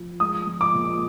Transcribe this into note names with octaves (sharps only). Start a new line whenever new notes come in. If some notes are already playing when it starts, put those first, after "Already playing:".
Already playing: F3
G#3 D#6
F3
D6
A#2